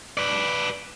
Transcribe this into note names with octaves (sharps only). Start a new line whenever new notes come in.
B4 D5